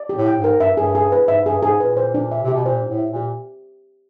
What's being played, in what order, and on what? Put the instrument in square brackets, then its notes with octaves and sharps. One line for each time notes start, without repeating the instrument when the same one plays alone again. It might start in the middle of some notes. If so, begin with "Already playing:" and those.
Already playing: [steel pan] D5
G4
[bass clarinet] A2
[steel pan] G5
[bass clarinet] G#2
[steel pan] A#4
[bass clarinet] G2 [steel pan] E5
[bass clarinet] G2 [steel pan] G#4
[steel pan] G#4
B4
[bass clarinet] G#2 [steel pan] E5
[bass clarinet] G2 [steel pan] G#4
[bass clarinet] G#2 [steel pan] G#4
[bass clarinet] A#2 [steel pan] B4
[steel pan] C5
D4
E5
[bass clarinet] C3
[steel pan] G4
[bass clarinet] B2
[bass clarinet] A#2 [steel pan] C5
[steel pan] D4
[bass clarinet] A2
[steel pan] E5
[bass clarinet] A#2 [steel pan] G4